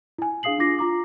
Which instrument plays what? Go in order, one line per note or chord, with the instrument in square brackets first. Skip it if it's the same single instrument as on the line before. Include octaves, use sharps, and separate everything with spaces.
[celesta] E4 G#5
D4 G#4 F5 D#6 C7 F#7
D4 E4 F4 D6 A#6 C7
F4 A#5 D6